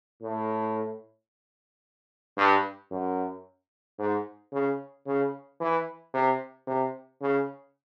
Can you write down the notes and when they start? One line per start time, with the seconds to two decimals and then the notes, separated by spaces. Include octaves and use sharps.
0.23 A2
2.38 G2
2.91 F#2
3.99 G#2
4.53 C#3
5.07 C#3
5.60 E3
6.14 C3
6.67 C3
7.22 C#3